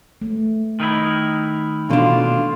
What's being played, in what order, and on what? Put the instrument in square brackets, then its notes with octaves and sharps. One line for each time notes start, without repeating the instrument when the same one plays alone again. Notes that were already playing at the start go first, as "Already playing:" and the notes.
[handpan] A3
[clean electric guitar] D#3 D#4 E4
[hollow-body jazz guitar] B2 D4 [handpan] E3 A4 [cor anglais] F4